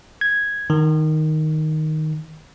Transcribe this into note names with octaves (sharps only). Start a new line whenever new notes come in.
G#6
D#3